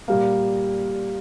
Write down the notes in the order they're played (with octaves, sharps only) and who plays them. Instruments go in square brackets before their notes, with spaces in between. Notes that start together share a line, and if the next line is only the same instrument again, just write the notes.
[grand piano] A#2 G3 A#3